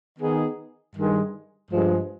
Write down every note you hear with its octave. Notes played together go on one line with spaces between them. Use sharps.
D#3 B3 D#4 G#4
G2 D#3 G#3
G2 F3 G#3